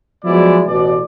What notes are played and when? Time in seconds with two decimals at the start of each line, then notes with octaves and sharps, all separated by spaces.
0.24 F3 F#3 G#3 B3 E4 D5
0.66 A1 B2 D5